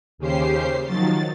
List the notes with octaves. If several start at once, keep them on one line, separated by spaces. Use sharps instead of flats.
D#2 C#3 C#4 G4 C5 C7
D#3 F3 F#3 A6